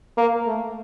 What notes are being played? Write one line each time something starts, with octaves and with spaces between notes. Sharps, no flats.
A#3
A3